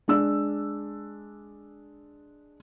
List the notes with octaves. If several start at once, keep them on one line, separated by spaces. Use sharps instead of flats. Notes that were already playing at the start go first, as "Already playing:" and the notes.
G#3 D4 E6